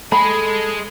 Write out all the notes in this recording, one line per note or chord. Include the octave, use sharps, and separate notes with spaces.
G#3 G#4 A4 B5